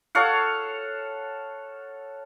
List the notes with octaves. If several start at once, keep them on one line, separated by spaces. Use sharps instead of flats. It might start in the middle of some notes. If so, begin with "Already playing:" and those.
A4 C#5 F5 F#5